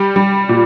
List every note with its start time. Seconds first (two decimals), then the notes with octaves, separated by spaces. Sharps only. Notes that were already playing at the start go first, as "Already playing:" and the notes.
Already playing: G3 G4
0.16 G3
0.49 A#2